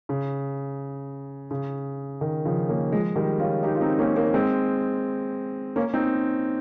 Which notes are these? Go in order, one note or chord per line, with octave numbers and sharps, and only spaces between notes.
C#3
C#3
D#3
C#3 F3
A#3 C#4
F3 G#3
D#3 G3
C#4 F4
D#4 G4
F4
C4 D#4
A#3 C#4
A#3 C#4
G#3 C4
A#3 C#4
C4 D#4